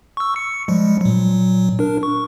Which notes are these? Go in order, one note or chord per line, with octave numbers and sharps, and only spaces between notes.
C#6 E6
C#7
F3 G3 G#3
A#2 F#3
D4 A#4
C#6